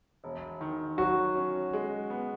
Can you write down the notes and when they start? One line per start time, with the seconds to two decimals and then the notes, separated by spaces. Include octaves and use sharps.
0.24 E1
0.61 D#3
0.98 F#3 F#4
1.35 C#4
1.73 G#3
2.10 B3